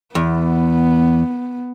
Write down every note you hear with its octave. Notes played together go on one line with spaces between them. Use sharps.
E2 B3